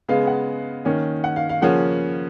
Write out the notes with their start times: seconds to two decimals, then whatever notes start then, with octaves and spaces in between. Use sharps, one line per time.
0.09 C#3 G#3 B3 F5
0.27 F#5
0.85 D#3 A#3 C#4
1.24 F#5
1.36 F5
1.49 F5
1.61 C#3 F3 A#3 C#4 F#5